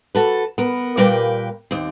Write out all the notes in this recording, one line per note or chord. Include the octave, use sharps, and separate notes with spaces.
F#4 A4 B4
B3 A#4
A#2 G3 A#3 A#4 B4 G5
D#2 C4